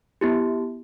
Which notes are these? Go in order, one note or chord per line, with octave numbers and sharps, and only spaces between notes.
B3 E4 G4